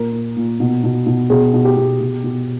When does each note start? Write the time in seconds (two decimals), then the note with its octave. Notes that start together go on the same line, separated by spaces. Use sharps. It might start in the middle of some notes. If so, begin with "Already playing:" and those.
Already playing: A#2 A#4
0.13 A#2
0.36 A#2
0.60 B2
0.84 B2
1.06 B2
1.30 B2 G#4
1.53 B2
1.65 G4
1.77 B2
2.01 B2
2.24 B2